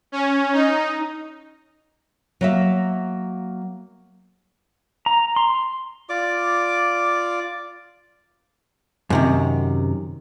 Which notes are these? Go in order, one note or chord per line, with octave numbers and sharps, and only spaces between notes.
C#4
D#4
F#3 A#3 E5
A#5
C6
F4 D5 D6
F#2 C3 D#3